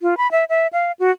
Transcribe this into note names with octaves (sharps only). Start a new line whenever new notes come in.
F4
B5
E5
E5
F5
F#4